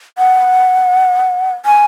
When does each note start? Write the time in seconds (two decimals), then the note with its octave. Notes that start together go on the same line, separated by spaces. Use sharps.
0.18 F#5
1.65 G#5